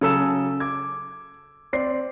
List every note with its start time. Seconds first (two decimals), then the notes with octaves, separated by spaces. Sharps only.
0.01 C#3 F#3 A4 E6 E7
0.60 D6 G#6
1.73 C4 D5 C7